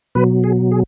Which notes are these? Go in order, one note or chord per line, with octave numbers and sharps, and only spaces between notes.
B2 F#3 B4
G#4
G#4